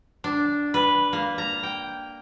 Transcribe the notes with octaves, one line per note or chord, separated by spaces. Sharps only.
D4
B4
A#3
A#5
G5